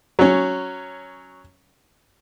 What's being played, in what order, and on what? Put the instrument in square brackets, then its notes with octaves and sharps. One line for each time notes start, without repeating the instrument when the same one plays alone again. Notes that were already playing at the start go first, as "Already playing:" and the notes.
[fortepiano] F#3 C#4